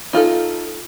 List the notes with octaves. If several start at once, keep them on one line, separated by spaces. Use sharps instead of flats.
D#4 F4 F#4 A4